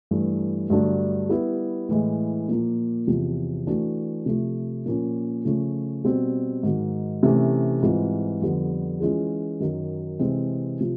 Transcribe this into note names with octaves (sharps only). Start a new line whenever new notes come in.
G2 E3 A3
G2 D3 F#3 A3 D4
G3 B3 E4
A2 E3 G#3
A#2 F3 A#3
E2 C3 F3
E3 A3 D4 F#4
C3 F3 A3
A#2 F3 A#3 C#4
C#3 F3 A3 C#4
B2 G3 C4
G#2 D#3 F#3
C3 E3 A3 C#4
G#2 E3 G3 C4 F4
F2 D3 G3 B3
E3 G#3 C#4 F4 G#4
F#2 D#3 F#3
C3 E3 G#3 C4
C3 F3